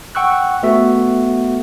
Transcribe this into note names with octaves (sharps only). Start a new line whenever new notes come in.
F#5 G5 C#6 E6 F#6
A3 B3 F#4 A4 E5